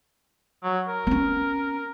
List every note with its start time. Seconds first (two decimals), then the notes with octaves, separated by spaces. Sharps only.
0.64 F#3
0.88 A#4
1.07 B3 C#4